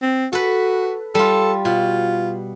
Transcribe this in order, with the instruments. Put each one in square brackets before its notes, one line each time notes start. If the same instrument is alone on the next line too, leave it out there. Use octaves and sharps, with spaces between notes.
[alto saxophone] C4
[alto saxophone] F#4 [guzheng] A4 B4
[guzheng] G3 F4 [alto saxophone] A4
[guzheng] B2 [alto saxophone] F4